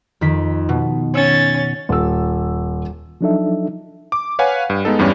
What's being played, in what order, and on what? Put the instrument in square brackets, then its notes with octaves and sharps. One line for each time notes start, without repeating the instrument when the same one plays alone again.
[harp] F2 D#3 B6
B2
[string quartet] C#4 A6 [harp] G#5 E6 E7
[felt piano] D#1 E6
[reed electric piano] F3 F#3 D4 D#4 A4 E5
[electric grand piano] D6
B4 C#5 F5 F#5 G#5
G2
G#3 B3 D#4 A4
E2 G2 E3 G3 C#4